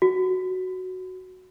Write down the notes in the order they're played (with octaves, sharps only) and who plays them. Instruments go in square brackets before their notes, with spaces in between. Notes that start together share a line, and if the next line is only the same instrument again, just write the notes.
[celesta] F#4